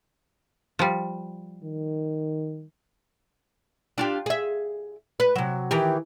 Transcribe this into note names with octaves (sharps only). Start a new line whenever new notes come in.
F3 G3
D#3
D4 F4 G4
G#4 E5
B4
C3 F#3
D#3 E3 G4